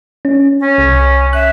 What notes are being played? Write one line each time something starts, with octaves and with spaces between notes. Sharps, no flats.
C#4
C#4
C2
E5 F#6